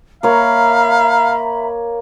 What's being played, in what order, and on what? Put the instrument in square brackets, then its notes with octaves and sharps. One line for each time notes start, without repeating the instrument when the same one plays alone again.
[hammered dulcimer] A#3 C#5 [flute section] E5 A#5 B5 [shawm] F5